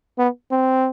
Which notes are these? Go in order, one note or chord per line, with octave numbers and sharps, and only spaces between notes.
B3
C4